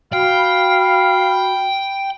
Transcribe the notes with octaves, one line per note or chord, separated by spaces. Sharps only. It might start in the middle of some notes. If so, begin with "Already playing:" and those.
F#4 F5 G5 B5